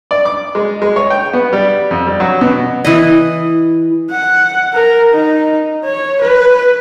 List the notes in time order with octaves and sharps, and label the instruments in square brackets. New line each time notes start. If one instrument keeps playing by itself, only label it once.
[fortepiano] D5
D6
G#3
G#3
C#5
G5
B3
G3
F2
G3
F#3
B2
[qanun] E3 B4 D#5
[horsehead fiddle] F#5
A#4
D#4
C#5
B4